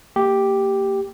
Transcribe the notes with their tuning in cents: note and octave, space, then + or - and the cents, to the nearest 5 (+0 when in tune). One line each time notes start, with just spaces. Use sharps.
A#3 -30 G4 +0